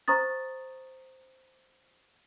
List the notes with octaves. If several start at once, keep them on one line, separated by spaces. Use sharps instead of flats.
C5 A#5 C#6 D#6 A6